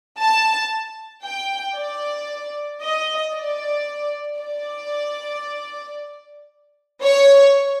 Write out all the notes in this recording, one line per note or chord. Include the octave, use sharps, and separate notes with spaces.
A5
G5
D5
D#5
D5
D5
C#5